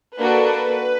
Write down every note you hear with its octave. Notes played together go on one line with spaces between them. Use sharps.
A#3 D4 F#4 A4 B4